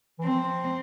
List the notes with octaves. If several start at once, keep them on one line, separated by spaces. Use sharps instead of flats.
E3
F3 C4